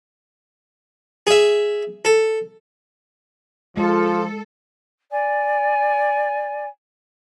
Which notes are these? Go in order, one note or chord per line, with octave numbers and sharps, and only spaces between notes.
G#4 E5
A4
F3 G#3 F4 A4
D5 G#5